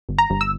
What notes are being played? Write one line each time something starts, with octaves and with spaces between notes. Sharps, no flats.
G1
A#5
G1
E6